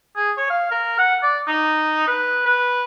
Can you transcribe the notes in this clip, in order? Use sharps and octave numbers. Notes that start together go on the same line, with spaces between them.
G#4
C#5
F5
A#4
F#5
D5
D#4
B4
B4